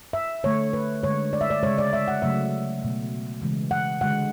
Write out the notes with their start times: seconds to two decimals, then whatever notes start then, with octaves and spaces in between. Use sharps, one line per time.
0.13 E5
0.44 D3 A3 C#5
0.73 B4
1.03 D3 G#3 C#5
1.33 D5
1.41 E5
1.50 D5
1.63 C#3 G#3 C#5
1.78 D5
1.93 E5
2.08 F#5
2.22 C#3 F#3 A3 E5
2.83 B2 A3
3.41 C#3 E3 G#3
3.71 F#5
4.01 D3 G#3 F#5